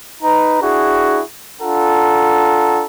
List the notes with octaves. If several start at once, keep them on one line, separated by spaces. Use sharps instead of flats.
D#4 B4 A#5
D4 E4 F#4 G#4
D4 F4 A4 F#5 A#5